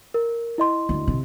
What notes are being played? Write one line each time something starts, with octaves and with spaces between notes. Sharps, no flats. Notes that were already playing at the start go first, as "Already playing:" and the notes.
A#4
E4 D#5 C6
D2
C3